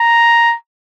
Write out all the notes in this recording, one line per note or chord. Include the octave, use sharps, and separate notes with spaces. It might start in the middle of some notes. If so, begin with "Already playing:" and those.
Already playing: A#5